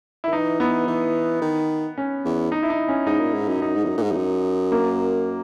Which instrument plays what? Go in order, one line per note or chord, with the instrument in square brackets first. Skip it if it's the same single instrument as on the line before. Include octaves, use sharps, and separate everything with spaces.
[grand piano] E4
[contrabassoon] D#3
[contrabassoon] E3 [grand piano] D#4
[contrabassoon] E3 [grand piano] B3
[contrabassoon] E3
D#3
[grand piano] C#4
[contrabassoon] E2
[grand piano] D#4
E4
D#4
C#4
[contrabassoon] G#2 [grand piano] D#4
[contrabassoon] A#2
G#2
F#2
[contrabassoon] F#2 [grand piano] D#4
[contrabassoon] G#2
E2
F#2
A#2
G#2
E2
F#2
[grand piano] A#3